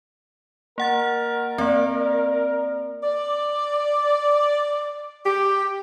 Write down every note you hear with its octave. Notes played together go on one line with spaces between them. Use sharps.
A#3 A#4 F#5 A6
A#3 C4 D5
D5
G4